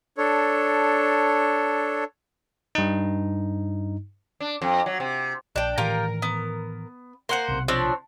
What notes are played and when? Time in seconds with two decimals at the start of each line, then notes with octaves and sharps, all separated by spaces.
0.18 D4 A4 C#5
2.75 G2 D#4
4.40 D4
4.62 F2
4.86 F#3
5.00 C3
5.56 A#1 D4 G5
5.78 A2 D#3 E3 F4 G4 A#4
6.22 B3
7.29 A#3 C5 F#5 C6
7.49 B1 C3
7.68 F3 C4 D4 C#5